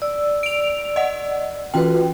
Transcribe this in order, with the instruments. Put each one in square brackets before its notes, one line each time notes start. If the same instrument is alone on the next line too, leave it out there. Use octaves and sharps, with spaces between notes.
[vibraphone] D5 E6
[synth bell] D7 F7
D#5 F#5
[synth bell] E3 C#4 G5 [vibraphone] F4 F#4 B4